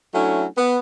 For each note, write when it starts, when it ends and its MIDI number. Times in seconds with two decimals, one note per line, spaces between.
0.14 0.45 54
0.14 0.45 57
0.14 0.45 61
0.14 0.45 62
0.14 0.45 64
0.57 0.78 59